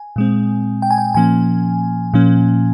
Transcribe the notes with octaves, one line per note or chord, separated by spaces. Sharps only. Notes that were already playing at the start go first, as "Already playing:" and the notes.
Already playing: G#5
A#2 G#3 C4
G5
G#5
G5
A#2 F3 A#3 C#4 G#5
A#2 F3 A#3 C#4